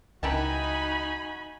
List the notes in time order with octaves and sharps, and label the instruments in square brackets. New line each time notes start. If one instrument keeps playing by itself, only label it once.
[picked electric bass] C#2 [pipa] D#3 E3 A5 [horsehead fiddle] D#4 B5 [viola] F#4 G#5